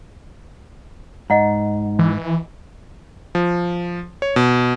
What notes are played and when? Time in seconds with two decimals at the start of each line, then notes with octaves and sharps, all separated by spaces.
1.30 G#2 D#5 F#5 A#5
1.99 E3
3.35 F3
4.22 C#5
4.36 B2